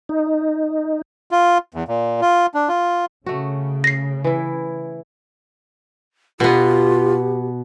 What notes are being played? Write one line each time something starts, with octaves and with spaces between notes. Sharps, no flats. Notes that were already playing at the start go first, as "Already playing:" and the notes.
D#4
F4
E2
A#2
F4
D4
F4
C#3 A3 F#4
A#6 C7
E3 E4
B2 B3 F4 G4